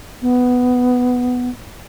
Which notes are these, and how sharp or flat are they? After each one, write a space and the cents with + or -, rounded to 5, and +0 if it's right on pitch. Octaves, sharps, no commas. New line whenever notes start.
B3 +5